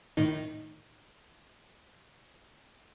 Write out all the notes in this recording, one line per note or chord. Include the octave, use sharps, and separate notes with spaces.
A2 D#3 D#4